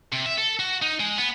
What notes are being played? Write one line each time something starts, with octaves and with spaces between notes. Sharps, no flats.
C3
E5
A4
F#4
D#4
G#3
B3